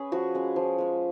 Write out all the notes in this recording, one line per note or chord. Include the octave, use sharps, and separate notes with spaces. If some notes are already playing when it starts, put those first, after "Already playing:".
Already playing: C#4 G#4 B4
F3 F#4
G#3 C#4
F3
G#3 C#4